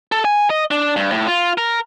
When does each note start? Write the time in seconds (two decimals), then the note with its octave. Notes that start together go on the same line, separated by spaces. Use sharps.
0.12 A4
0.25 G#5
0.50 D#5
0.71 D4
0.96 G2
1.12 A2
1.27 F4
1.58 A#4